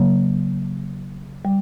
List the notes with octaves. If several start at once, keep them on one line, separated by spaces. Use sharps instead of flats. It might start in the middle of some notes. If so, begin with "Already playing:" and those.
Already playing: C#3 F#3 A#3
G3